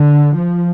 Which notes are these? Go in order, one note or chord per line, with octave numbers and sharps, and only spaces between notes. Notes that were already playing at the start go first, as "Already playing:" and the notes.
Already playing: D3
F3